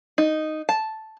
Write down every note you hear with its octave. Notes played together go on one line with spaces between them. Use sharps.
D#4
A5